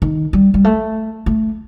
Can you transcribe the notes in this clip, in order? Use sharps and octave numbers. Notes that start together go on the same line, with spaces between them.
D#3
G3
G3
A3
A3